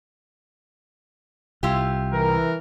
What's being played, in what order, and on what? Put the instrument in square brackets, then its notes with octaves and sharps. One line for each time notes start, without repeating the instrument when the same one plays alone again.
[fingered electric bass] C2 [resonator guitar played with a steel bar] E4 F4 G4
[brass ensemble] E3 A#4